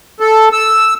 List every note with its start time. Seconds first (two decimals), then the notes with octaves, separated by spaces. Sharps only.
0.20 A4
0.53 E6